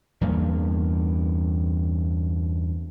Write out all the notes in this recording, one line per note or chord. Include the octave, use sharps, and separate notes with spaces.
E2 G2 A#3